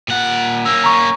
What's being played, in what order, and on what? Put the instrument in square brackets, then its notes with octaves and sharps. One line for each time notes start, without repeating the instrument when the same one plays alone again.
[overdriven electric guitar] A#2 F#5
[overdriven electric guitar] A#3 C#4 [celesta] E6
[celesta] A#5 C#6